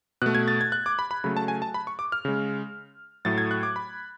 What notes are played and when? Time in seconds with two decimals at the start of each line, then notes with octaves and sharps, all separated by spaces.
0.22 B2 A3 F#6
0.35 G#6
0.48 A6
0.61 G#6
0.72 F#6
0.86 D6
0.99 B5
1.11 B5
1.24 C#3 F#3 A3 B5
1.37 A5
1.48 G#5
1.62 A5
1.74 B5
1.87 C#6
1.99 D6
2.12 F6
2.25 C#3 G#3
3.25 A2 F#3 A3 A6
3.38 G#6
3.51 F#6
3.63 D6
3.76 B5